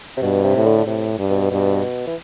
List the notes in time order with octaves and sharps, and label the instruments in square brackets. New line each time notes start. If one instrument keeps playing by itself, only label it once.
[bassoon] C3
[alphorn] G2 [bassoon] B2
[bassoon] C3
[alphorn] A2
[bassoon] D3
D3
[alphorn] A2 [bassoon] C3
[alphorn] G2
[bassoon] B2
[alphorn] G2 [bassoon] B2
[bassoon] E3